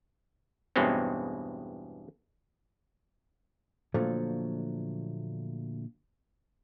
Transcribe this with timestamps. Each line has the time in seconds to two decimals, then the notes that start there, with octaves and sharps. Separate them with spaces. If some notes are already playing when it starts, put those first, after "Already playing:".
0.76 E2 G2 B2 G#3 C4 C#4
3.94 A#2 D3 F3 F#3 A3